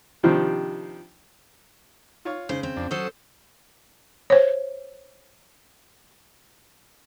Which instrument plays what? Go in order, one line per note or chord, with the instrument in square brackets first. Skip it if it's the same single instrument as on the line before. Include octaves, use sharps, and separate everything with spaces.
[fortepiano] C3 D#3 F3 G3 D4
F4 C#5 C#6
[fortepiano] C#3 [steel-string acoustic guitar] C5
[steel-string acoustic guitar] C4
[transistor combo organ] F2 D4
[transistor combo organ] F#3 D#6 [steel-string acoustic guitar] C#4 A4 C5
[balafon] C5 C#5